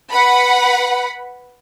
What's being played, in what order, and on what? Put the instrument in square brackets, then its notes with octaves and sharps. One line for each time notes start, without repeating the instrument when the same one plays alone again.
[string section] B4 F#5 B5